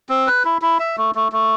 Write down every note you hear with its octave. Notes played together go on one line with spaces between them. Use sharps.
C4
B4
E4
E4
E5
A3
A3
A3